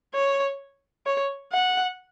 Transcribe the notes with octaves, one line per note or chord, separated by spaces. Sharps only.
C#5
C#5
F#5